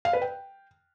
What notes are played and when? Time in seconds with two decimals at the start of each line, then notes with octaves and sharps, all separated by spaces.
0.05 F5
0.13 B4
0.22 G5